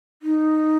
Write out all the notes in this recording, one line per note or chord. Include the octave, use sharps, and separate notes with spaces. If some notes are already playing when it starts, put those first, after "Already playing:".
D#4